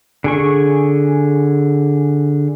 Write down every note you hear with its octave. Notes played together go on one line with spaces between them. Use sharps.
D3 G#4 C#6